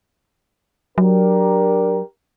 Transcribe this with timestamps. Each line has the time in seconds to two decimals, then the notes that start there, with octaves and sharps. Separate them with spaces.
0.98 F#3 D4 G4 A#4